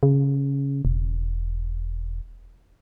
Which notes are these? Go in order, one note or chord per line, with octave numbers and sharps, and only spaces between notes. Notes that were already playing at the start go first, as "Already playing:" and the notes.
C#3
E1